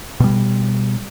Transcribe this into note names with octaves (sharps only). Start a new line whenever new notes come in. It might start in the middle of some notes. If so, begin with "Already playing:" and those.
B2 G3